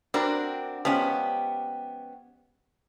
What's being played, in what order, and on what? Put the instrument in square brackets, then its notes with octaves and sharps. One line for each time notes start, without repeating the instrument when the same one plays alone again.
[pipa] G3 C4 [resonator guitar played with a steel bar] D4 F#4 A#4
[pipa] F3 G#3 [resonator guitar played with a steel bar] B3 C#4 G4